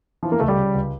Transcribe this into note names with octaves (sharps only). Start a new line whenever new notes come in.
E3 F3 F4
A#3 A#4
C#2 A3 A4
G3 G4
C#3
C#2